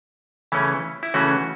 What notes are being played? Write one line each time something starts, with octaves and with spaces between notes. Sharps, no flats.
C#3 E3 A3 C#4 E4
E4
C#3 E3 A3 C#4 F#4